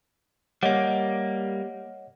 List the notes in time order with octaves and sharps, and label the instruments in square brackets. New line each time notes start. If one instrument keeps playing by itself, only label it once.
[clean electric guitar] G3 A#3 [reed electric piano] C#5 D#5 F#5